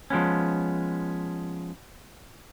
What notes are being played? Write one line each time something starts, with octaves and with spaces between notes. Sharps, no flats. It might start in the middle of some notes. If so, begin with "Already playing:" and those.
F3 G#3 B3 C#4